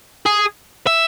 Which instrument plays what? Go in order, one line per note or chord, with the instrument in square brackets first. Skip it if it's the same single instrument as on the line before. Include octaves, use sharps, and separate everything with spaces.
[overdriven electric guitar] G#4
E5